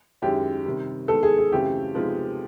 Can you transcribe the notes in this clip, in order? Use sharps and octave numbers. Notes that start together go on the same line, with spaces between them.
F#2 D#3 G#3 C#4 E4 G4
C3 D#3 G3
D#3 G#3 B3 A4
G#4
G#4
F#2 C#3 E3 A3 C4 G4
C3 F3 G#3 B3 D#4